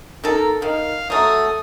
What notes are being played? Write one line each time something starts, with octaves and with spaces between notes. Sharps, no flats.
D#3 A4 A#4
D#3 F5
F#3 A3 D#6